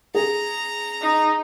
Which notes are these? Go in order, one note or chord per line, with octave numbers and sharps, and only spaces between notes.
G#4 A#5
D#4